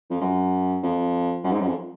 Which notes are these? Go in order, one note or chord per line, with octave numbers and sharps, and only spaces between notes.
F2
F#2
F2
F#2
G#2
F#2
F2